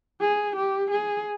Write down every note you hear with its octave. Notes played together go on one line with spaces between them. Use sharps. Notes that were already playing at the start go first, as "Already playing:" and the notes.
G#4
G4
G#4